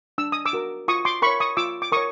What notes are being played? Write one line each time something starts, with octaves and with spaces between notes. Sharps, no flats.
D4 E6
D#6
D6 E6
F#4 A#4
F4 C#6 D#6
C6 D6
A#4 C#5 B5 C#6
C#6 D#6
F4 D6 E6
D6
A#4 C#5 C#6 D#6